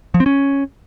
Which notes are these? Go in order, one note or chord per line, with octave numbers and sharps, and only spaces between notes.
F3
C4
C#4